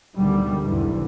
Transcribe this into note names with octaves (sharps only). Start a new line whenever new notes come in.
D2 B2 D3 D#3 G3
F#1 B1 E2 G#2 D3 E3